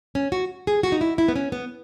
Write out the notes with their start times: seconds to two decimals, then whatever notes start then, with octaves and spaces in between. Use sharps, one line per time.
0.15 C#4
0.32 F#4
0.67 G#4
0.83 F#4
0.92 D#4
1.01 E4
1.18 E4
1.28 B3
1.36 C#4
1.52 B3